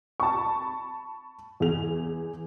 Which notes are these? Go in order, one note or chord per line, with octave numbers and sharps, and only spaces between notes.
A5 B5 C#6
E2 G#4 F7